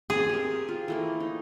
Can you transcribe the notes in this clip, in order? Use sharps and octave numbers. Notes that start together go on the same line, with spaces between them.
C4 G#4 D#5 A5
G4 A#4
F4
E3 A3 A#3
D#4